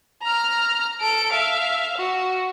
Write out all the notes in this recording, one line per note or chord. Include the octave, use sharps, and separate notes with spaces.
A#5 F6
A4 D7
E5 F5
F#4